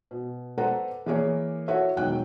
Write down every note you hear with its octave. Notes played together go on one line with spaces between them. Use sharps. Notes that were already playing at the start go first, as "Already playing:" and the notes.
B2
A4 B4 C5 D5 F#5 A#5
E3 A#3 G#4 A#4 C#5 D5
E4 F#4 A4 C#5 E5
E1 D#3 F#3 G5 F#6